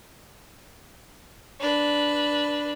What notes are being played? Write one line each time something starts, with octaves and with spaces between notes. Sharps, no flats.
D4 B4